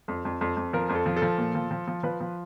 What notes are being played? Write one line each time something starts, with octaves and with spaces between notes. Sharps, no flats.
F2
F2
F2
F2
F3 A#4
F2
A4
F3
A4
F3
A#2
F3
F3
F3
F3 B4
F3